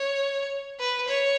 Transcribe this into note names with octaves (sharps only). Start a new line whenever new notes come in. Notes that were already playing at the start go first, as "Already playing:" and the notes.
Already playing: C#5
B4
C#5